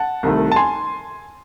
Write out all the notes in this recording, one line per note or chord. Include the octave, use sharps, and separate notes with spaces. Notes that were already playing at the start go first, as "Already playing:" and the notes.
Already playing: F#5 A5
C2 C3 D#3 A3
A5
G#5 C6